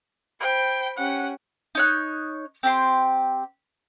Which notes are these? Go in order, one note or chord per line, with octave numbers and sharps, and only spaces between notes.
C5 G5 B5
C#4 G4 F#5
D#4 C#5 F#6
C4 G4 C6